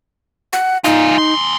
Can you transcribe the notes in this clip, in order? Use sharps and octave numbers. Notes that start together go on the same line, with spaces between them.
F#5
G#2 D#4 F4
E2 C6